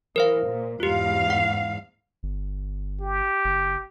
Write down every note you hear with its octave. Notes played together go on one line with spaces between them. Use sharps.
E3 A#4 C5 F5
A#2
E2 G#2 F4 G4 F5
F#5
G1
G4
F#1